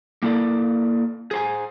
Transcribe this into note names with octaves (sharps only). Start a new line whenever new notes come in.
A#3 E4 A4 D5
G#4 C5 G#5